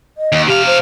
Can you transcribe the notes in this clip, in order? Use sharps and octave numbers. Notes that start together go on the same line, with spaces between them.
D#5
D#2
C3 G4 F5
C5